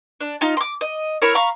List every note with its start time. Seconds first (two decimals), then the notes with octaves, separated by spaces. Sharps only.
0.21 D4
0.41 D#4 F4
0.57 C6 D6
0.81 D#5
1.22 E4 A#4 C#5
1.35 F5 A#5 B5 C#6